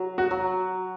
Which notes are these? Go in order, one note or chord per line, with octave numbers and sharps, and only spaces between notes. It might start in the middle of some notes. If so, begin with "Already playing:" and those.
Already playing: F#3
F#4
F#3